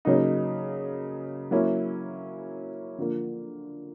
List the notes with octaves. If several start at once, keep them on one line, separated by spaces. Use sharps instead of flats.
C#3 F#3 A#3 D#4
F#3 A#3 C#4 E4
D3 F3 A#3